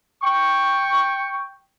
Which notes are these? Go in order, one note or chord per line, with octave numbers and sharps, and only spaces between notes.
G5 C#6